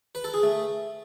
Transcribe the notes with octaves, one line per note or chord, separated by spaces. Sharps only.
B4
A4
G#4
A3